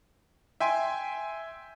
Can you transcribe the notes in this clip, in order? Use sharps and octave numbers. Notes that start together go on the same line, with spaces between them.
E5 G5 G#5 C6